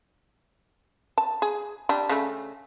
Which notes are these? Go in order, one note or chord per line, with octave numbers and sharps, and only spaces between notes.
A5
G#4
G3 D4
C#3 A3